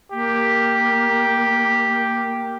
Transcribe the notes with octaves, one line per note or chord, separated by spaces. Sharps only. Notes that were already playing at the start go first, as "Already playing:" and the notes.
A#3 G4